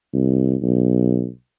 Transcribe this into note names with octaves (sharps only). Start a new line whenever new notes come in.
C2
B1